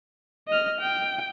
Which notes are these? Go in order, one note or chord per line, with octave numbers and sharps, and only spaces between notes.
D#5 F6
G5